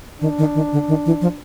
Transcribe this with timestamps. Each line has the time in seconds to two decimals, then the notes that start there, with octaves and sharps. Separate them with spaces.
0.21 D#3 D4
0.38 D#3
0.55 D#3
0.72 D3
0.88 D#3
1.06 E3
1.21 F3